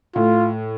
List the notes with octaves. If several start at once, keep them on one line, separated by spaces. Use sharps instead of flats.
A2 F4